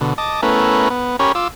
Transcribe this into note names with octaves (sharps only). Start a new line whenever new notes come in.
B2 D3
D#5 A5 D6
A3 B3 C#4 E4 A#4 B4
B3
C#4 G4 A#4 C#5 B5
F4 D6 E6